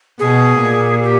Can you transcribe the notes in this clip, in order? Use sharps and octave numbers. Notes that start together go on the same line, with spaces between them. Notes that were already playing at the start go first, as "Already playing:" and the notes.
B2 G#4
A#2
G4